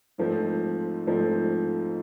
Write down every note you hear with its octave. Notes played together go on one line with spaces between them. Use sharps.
G#2 F3 A3 C4
G#2 F3 A3 C4